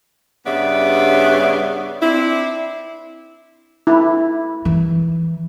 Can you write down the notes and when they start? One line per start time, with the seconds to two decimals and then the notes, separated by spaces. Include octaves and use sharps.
0.45 G2 C#3 B3 D5 E5
2.02 C4 D4 E4
3.87 E4
4.65 E3